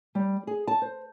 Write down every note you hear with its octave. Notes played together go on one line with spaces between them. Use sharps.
G3
G#4
A5
C5